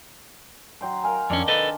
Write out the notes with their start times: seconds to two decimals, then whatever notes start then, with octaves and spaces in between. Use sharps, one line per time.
0.81 F#3 G5 C6
1.04 A#4 F5 G#5
1.30 F2 D#3 C#4 D4
1.48 A4 B4 D#5